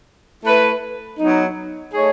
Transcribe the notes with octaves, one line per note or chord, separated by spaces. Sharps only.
A3 E4 B4
F#3 B3 D#4
A3 D#4 G#4 C#5